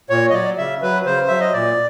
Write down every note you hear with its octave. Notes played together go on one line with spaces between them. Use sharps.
A#2 C#5
D#5
F#3 D5
C#3 E5
F#3 B4
C#3 C5
F#3 E5
D#5
A#2 D5